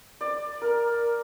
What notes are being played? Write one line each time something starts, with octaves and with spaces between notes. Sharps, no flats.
D5
A#4